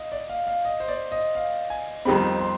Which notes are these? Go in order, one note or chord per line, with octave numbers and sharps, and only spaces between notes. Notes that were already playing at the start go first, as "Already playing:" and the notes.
Already playing: D#5 F5
D5
F5
F5
D#5
C5
D5
D#5
F5
G#5
F2 D#3 G3 C4 B5
C6